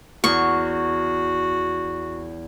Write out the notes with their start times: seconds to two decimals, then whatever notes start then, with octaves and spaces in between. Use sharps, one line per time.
0.24 E2 F#4 C#6